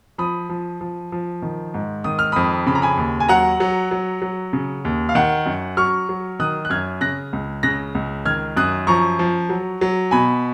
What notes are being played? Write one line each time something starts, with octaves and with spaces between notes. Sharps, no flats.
F3 B5 D#6
F3
F3
F3
D#3
G#2
D#3 D#6
F6
F2 B5 D#6
C#3 B5
A#5
G#5 B5
D#2
G#5
F#3 F#5 A#5
F#3
F#3
F#3
C#3
D#2
F5
D#3 F#5
F#2
F#3 C#6 F6
F#3
D#3 D#6 F#6
F#6
F#2 F6 G#6
C#3 F#6 A#6
C#2
C#3 F#6 A#6
C#2
D#3 F6 G#6
F#2 D#6 F#6
F3 A#5 C#6
F3
F#3
F#3
B2 G#5 B5